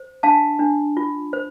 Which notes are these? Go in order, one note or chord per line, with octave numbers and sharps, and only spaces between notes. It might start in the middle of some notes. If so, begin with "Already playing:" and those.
Already playing: C5
D4 F5 A5
D4
F4
C5